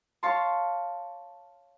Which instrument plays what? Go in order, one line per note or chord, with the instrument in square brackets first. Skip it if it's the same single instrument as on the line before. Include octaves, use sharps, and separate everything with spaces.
[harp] C#5 F5 A5 C6